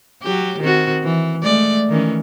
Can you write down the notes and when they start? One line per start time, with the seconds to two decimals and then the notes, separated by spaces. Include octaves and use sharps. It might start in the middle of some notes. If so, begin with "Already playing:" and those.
0.22 F#3 G4
0.60 D#3 C4 F#4
1.03 E3
1.43 G#3 A3 D5
1.89 D#3 E3 C#4